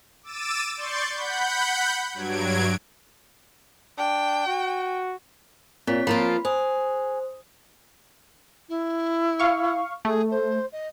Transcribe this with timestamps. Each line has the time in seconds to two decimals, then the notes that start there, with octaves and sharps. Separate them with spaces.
0.23 D6 E6 A6 D#7 E7
0.77 D5 C6 C#6 G6 A6
1.12 F#5 B5 G6
2.14 G2 F#3 G#6 D7
3.98 D4 G5
4.47 F#4
5.87 A#2 C4 C#5 B6
6.07 F3 A#3 F4 B5
6.45 G#4 C5
8.69 E4
9.40 F5 C#6
10.05 A3 G#4
10.31 C5
10.72 D#5